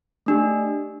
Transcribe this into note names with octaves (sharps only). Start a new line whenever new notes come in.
A3 D4 G4